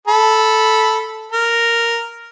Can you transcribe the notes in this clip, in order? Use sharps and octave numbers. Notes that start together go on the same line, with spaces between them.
A4 B5
A#4